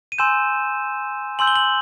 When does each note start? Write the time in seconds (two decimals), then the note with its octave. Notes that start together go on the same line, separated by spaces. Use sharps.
0.12 D#7
0.18 G#5 C6 E6 G6 E7
1.39 G#5 C6 E6 G6 F#7
1.47 G7
1.56 F#7